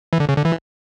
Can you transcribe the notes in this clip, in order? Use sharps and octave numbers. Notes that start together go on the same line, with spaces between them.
E3
D3
C#3
D3
E3